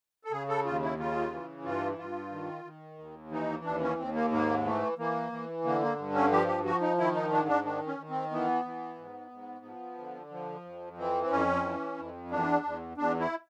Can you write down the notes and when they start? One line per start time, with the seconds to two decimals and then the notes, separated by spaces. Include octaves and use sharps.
0.24 A4
0.32 C#3 G#4
0.49 A4
0.65 D#2 F4
0.83 E4
0.98 C#3 F4
1.32 E3
1.65 G2 F4
1.98 G2 F4
2.32 D#3
2.65 D#3
2.99 D#2
3.31 E3 D#4
3.65 D#2 D4
3.82 C#4
3.98 D#2 C4
4.15 A#3
4.32 G#2 A#3
4.65 E3 A3
4.98 E3 A#3
5.32 E3
5.64 D3 A#3
5.82 A#3
5.98 G2
6.15 C#4
6.32 F3 G4
6.48 G4
6.65 F3 F#4
6.81 D#4
6.98 D#3 E4
7.14 D#4
7.31 G#2 D4
7.48 D4
7.64 D#3 D4
7.87 C#4
7.98 D#3
8.10 C4
8.31 E3 B3
8.65 E3
8.98 G#2
9.31 G#2
9.65 F3
9.98 D3
10.31 F3
10.65 F2
10.98 E3 C4
11.24 C4
11.31 F2 C#4
11.65 E3
11.98 F2
12.31 E2 D4
12.65 E2
12.97 E2 D4
13.20 E4